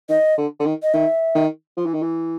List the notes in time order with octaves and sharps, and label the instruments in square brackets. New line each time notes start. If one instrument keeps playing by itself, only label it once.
[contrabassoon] D#3 [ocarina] D#5
[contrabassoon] D3
D3
D#3
[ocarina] D#5
[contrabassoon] D#3 [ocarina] E5
[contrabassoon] D#3
F3
E3
D#3
E3